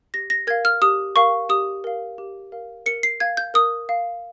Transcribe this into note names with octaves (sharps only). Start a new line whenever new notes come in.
G4 A#6
A#6
A#4 F5 G#6
F6
G4 D#6
A#4 F5 C#6
G4 D#6
A#4 F5
G4
A#4 F5
A#4 C#7
C7
F5 G#6
G6
A#4 D#6
F5